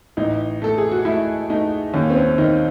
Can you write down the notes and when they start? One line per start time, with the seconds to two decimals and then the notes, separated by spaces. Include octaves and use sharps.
0.17 A1 D#4
0.62 A3 A4
0.78 G#4
0.92 F#4
1.05 A3 E4
1.50 A3 D#4
1.94 D#2 C#4
2.10 C4
2.16 C#4
2.38 D#3 D#4